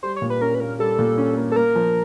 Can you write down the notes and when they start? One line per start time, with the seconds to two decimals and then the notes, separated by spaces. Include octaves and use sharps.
0.03 G3 C5
0.16 C#5
0.22 A#2
0.30 B4
0.41 C#4 A#4
0.54 B4
0.60 A#3 A#4
0.79 G3 A4
0.99 A#2
1.18 C#4
1.37 A#3
1.52 A4
1.56 A#3 A#4
1.76 F3